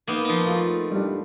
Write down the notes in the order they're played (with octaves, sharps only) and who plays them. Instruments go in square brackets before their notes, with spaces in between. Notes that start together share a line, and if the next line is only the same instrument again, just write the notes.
[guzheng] A#3 B3 D#4
F3 D#4
[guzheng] A3 [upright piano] F4
[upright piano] G3 D4